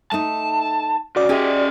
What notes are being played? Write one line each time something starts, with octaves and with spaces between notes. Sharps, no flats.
A3 D#4 A5
C#3 F#4 D5
C#4 G4 G#4 D#5 E5